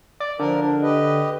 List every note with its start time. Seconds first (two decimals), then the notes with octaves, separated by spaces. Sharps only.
0.20 D5
0.39 D3 F3 A#4
0.61 D3 D4
0.82 G4 B4 D#5